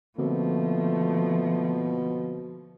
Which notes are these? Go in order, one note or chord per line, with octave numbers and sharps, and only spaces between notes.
B2 D3 F3 A3 A#3 C4